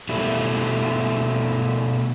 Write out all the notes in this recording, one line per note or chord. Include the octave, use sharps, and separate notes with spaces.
B2 G3 A3 E4